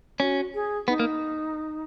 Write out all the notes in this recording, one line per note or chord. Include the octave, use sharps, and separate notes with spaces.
C#4 F#4
G#4
B3 D#4
A#3